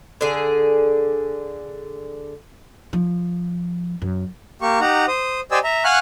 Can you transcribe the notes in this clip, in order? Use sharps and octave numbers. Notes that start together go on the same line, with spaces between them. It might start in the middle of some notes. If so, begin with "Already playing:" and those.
D3 G#4
F3
F#2
A#3 G4 C#6
D#4 G4 F#5 A#5
C5 D#6
G4 C5 D5 D#5 G#5 E6
E5 A#5
F5 F#5 G#5 C#6 F6 F#6